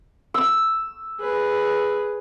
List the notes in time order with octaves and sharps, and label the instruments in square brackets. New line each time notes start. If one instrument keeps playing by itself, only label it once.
[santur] E6
[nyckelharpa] G#4 B4